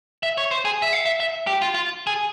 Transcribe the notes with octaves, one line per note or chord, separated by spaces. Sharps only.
E5
C#5
C5
G#4
E5
F5
E5
E5
G4
F4
F4
G#4